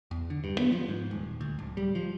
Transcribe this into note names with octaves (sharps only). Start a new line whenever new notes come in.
E2
D3
G2
B3
F3
G#2
D#1
D2
D1
G3
F3